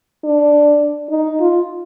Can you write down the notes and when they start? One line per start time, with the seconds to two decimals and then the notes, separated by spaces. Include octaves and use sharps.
0.24 D4
1.10 D#4
1.40 F4